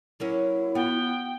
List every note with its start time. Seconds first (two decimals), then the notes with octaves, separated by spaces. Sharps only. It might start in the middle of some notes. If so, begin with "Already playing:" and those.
0.20 F#3 A#3 C#4 E4
0.75 B3 F4 F#4 G5